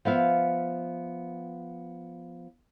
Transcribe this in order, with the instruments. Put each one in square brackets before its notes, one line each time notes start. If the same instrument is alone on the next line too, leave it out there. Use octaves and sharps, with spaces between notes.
[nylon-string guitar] F3 B3 E5 F5